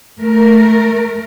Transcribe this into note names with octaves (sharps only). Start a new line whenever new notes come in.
A3 A#4